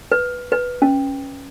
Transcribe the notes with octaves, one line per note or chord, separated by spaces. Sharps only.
B4
B4
C#4